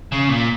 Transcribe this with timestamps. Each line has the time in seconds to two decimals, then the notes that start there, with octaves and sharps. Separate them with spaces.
0.12 C#3
0.29 A#2